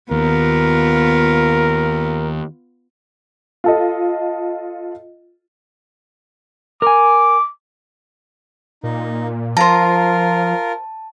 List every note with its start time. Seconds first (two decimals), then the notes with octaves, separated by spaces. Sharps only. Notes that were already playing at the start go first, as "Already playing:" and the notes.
0.11 D#2 B3 F4 A#4
3.64 F4 A4 D#5
6.82 A#4 G#5 D6
8.83 A#2 D#4
9.57 F3 F4 A#4 C5 A5 A#5